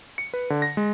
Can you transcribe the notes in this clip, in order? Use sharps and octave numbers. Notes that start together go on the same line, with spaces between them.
C#7
B4
D3
A#6
G#3